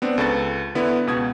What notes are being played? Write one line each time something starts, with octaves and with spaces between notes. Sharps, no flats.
B3 C4 D4
C#2 A4 B4 A6
D3 B3 E4 B4
C#2 B2 D#6 G#6